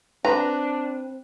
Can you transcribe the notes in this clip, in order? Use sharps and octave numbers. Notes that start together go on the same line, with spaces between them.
C4 D4 B4 A#5